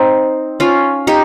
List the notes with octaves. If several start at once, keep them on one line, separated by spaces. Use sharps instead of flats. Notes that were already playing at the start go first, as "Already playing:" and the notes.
Already playing: C4 D#4
C#4 F4
D#4 G4